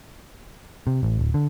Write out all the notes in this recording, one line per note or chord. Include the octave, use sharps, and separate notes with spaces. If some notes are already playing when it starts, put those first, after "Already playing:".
C3
A1
D1
D3